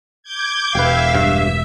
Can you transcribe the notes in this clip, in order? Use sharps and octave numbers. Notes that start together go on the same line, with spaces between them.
D6 G6 G#6
E1 G4 B4 E5 F5
G2